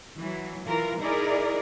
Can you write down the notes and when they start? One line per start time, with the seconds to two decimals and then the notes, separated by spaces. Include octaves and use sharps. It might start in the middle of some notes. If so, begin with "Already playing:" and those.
0.18 E3 F#3
0.65 E3 F4 A#4
1.01 D#4 E4 G#4 A#4 D5